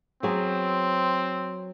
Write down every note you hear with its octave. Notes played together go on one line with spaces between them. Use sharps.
F#3 B3 C4 G#4